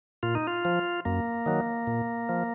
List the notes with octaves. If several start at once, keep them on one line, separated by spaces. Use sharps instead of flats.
A#2 F4
D#4
F4
F3
F#2 A#3
D#3 F#3
A#2
F3